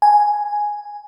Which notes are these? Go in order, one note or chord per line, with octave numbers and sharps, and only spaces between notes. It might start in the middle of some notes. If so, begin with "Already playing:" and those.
G#5